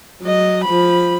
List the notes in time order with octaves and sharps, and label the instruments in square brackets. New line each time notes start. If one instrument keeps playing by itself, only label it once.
[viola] F#3 D#5
F3 B5